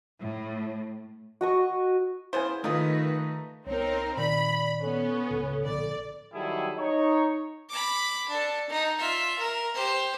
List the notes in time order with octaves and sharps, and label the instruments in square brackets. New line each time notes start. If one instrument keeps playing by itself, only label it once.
[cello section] A2
[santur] F#4 D#5 C#6
[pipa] C#3 B3 C5 [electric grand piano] E4 G#5
[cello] D#3 B4 [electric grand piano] A3 D#4 D#6 [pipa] A#3 F4 G#4
[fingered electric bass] C2 B3 [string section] C4 D#4 A#4 [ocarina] C#5
[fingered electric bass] A#2 D#3 [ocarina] D5 [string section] B5
[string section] B3 C#4 [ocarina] A4
[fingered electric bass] C#2 A2 C#3
[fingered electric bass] A#1 A2 D3 [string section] D5
[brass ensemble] D#3 F#3 G3 E4 G#4 A4
D#4 C#5
[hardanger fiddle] B5 D6
D4 A4
D#4
F4 E5
A#4
G4 C5